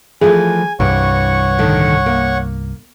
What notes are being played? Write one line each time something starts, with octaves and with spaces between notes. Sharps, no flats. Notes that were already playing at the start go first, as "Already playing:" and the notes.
E3 F3 A3 G#4 G#5
C2 G2 E3 C#5 F#5 C#6
A2 D3 D#3
A#3